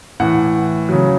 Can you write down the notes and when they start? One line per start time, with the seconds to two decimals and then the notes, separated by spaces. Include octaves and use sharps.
0.20 A2 E3 F#5
0.89 C#3 F#3